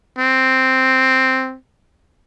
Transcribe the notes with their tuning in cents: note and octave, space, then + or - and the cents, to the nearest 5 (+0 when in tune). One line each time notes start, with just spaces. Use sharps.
C4 +0